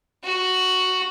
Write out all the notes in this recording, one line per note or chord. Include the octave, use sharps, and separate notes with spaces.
F#4